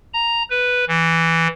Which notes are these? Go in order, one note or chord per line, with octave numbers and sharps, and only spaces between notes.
A#5
B4
E3